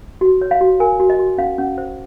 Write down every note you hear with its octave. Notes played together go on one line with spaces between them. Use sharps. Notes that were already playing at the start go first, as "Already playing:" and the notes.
F#4
C#5
F5
F#4
A#4 G#5
F#4
D#5
F#4
C#4 F5
C#4
C5